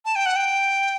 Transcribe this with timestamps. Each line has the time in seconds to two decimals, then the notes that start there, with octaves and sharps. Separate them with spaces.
0.05 A5
0.16 G5
0.26 F#5
0.36 G5